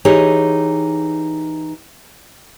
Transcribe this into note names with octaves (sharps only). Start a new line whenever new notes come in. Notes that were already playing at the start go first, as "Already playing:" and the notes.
E3 D#4 G4 G#4 C#5